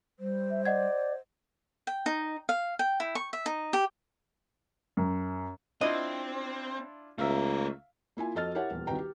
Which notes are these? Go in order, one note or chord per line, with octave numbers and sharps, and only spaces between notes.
G3 C5
E5
D5 D#5 F#5 G#6
G5
D#4
F5
G5
E4
C#6
E5
D#4
G4
F#2
C4 D4 E4 F4 D#5
C#2 A3 A#4 E5 F5
A#3 E4 F4 G#5
F2 F#4 A4 D#5 F6 A6
E4 G4 A#4 C#5 E5 F#5
D#1 E2
C2 D#3 F#4 B4 G5 A#5
G4